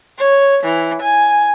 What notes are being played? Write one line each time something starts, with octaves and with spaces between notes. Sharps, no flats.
C#5
E3
G#5